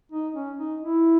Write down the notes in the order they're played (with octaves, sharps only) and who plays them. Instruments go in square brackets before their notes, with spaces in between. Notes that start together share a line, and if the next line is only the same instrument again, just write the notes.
[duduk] D#4
C#4
D#4
E4